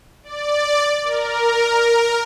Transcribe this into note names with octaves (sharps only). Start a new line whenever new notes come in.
D5
A#4